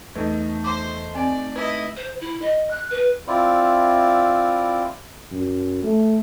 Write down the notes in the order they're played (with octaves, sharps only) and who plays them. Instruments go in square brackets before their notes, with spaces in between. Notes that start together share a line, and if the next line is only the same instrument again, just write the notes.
[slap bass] E2 [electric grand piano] A3 D#4 [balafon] B4
[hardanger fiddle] C5 [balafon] D6
[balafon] C4 [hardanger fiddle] D5
[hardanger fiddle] E4 D#5 [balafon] B4
[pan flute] C5
E4
D#5
F#6
B4
[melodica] C4 E4 F4 D5
[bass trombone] F#2
A3